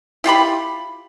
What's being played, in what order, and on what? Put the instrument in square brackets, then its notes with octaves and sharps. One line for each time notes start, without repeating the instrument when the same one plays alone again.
[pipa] E4 F4 G4 B5